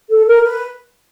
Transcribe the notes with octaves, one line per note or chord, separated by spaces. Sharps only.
A4
A#4
B4